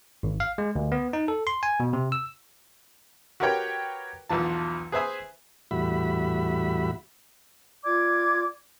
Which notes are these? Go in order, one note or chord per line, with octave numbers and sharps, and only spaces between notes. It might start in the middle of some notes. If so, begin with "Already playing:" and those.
G#1
F5
G#3
D2
B3
D#4
A4
C6
G#5
B2
C3
E6
F#4 G4 A#4 B4 C#5 G5
B1 E2 F3 A5
G#4 B4 C5 E5 G#5 D#6
E2 A2 G3 F#4 E5 B5
F4 D5 D6 G#6